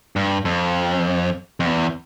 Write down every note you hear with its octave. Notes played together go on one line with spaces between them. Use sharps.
G2
F2
F2
E2